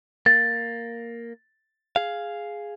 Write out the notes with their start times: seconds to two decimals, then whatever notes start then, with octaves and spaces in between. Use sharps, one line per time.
0.26 A#3 A6
1.96 G#4 F5